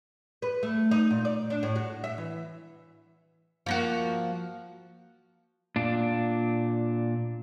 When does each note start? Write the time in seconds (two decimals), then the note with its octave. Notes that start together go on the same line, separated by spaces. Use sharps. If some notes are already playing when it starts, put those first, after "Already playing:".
0.42 B4
0.63 A3
0.91 D#4
1.11 A#2
1.25 D5
1.50 D4
1.63 A2
1.76 F#4
2.04 E5
2.18 E3
3.66 F3 A#3 F#4
5.76 A#2 D4